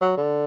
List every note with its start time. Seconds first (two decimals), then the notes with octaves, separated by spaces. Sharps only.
0.02 F#3
0.18 D3